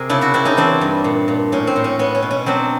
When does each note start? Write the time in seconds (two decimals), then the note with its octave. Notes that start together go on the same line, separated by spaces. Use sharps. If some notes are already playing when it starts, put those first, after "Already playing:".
Already playing: C3 G#4 A#4
0.09 C#3 D4 E4
0.21 E4 F#4
0.34 C4 D4 E4
0.45 C#4 D#4
0.57 E3 C4 D4
0.81 G2
1.04 A#2
1.28 A#2
1.52 A2 C#4
1.67 C4
1.76 A2
1.84 C#4
1.99 B3 C#4
2.15 C#4
2.22 B2
2.31 C#4
2.46 F#3 C4 D4